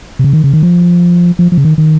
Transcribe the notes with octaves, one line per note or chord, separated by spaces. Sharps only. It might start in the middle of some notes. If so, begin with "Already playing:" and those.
C3
C#3
D#3
C#3
D#3
F3
F3
F3
C#3
D#3
D#3